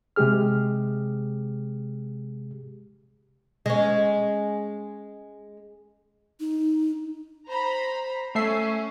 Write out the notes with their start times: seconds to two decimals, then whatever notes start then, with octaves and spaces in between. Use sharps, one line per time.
0.16 C3 G#3 G4 G#4 F6
3.66 G#3 C#4
6.40 D#4
7.48 C5 A#5 B5
8.35 A3 C#4 E5 C7